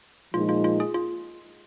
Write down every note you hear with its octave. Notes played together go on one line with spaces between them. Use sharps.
A#2 F3 G#3 D#4 F4
F4
F4
G#4
F4